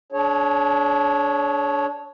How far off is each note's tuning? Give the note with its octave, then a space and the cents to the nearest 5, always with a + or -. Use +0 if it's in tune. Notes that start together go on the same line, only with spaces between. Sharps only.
D4 -20 G#4 +40 C#5 +0